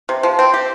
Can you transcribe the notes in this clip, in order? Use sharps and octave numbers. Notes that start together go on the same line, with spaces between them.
C3
F3
C4
G4